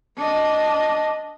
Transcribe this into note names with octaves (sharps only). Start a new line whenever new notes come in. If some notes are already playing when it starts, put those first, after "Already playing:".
D4 D#5